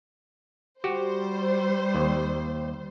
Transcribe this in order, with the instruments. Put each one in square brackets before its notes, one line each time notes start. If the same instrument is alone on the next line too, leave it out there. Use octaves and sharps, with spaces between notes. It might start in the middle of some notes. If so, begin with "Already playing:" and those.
[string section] G3 C5 [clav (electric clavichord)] F#4 G4
[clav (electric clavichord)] D#2